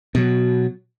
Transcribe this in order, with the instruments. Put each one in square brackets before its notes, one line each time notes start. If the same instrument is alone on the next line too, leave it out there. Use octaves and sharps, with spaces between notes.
[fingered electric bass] B2 F#3